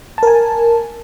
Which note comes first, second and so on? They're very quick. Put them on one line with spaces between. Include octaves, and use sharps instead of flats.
A5 A#4 G#5